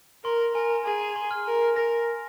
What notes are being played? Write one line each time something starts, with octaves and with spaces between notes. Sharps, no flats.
A#4 C6
A#4 G#5
A#5
G#4 G#5
A#5
C6
F6
A#4
A#4 A#6